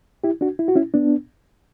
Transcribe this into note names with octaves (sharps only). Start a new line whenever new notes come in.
E4 G4
D4 F#4
E4
F#4
C#4 E4
B3 D4